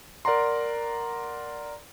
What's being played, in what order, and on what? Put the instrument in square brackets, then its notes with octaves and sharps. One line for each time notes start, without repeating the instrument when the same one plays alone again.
[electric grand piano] A#4 D5 F#5 A#5 C6